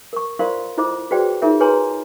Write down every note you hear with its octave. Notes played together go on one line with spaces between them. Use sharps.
A#4 C#6
F4 A#4 C5 D5 F5 C6
E4 F4 A4 C5 D#5 D6
F#4 G#4 B4 C5 D5 G5
D#4 F4 G#4 A#4 C#5 E5
G#4 B4 C#5 G#5 A#5 C6